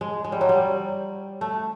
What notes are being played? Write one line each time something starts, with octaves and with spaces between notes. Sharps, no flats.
G#3
G#3
G3
F#3
G3
A3